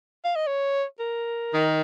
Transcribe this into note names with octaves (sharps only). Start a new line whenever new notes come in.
F5
D#5
C#5
A#4
D#3